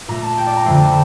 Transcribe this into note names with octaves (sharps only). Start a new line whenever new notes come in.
A#2 A3 A#5
A5
G5
D5
A#5
F2 D3 F3 A3 C6
A5